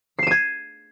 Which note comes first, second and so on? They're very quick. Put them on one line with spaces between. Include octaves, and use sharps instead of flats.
C7 E7 D#7 G#6